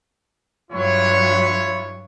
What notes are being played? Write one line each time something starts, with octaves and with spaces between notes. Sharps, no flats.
G2 F#3 E4 F4 C#5